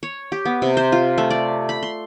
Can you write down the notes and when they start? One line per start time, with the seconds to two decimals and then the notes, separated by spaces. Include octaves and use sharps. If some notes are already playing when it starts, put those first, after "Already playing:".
0.03 C#5
0.32 G4
0.45 B3
0.62 C3
0.77 C5
0.92 F4
1.18 A3
1.30 D5
1.69 B5
1.83 C6